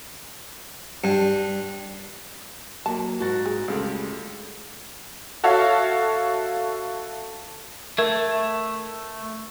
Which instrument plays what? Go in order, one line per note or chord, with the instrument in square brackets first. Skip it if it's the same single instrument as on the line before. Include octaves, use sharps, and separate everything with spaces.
[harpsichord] G2
[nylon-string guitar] F#3 A#3 [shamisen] A5
[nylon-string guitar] G#2 [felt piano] F#4 A6
[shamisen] G#4
[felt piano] C#2 [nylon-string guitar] D3 G3 A3
[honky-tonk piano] F#4 A4 C#5 E5 F5
[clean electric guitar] A3 [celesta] A#4 E5 G#6